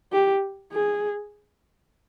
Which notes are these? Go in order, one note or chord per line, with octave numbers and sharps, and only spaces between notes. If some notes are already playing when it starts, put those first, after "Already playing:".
G4
G#4